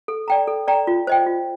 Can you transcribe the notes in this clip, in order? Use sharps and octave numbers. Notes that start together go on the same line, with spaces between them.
A4
D5 G5 A#5
A4
D5 G5 A#5
F4
C5 D#5 G5
F4